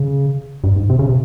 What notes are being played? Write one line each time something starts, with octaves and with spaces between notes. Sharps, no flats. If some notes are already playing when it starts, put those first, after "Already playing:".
Already playing: C#3
G2
G#2
C3
C#3
C3